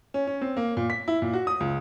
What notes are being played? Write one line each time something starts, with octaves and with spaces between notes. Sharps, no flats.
C#4
C#4
C4
A#3
A#2
B6
E4
A#2
F#4
D#6
C#2